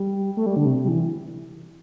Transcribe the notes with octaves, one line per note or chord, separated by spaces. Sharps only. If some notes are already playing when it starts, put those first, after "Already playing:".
Already playing: G3
A3
G3
D3
C3
G3
E3